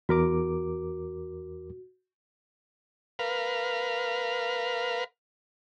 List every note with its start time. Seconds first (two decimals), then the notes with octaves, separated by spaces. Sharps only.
0.09 E2 F#4 A#4 D6
3.19 A#4 B4 F5